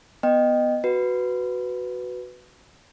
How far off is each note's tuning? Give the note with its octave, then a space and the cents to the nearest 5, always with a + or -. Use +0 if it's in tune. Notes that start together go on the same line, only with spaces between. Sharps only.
B3 +0 D#5 -15 G5 +0
F#4 +0 B4 +5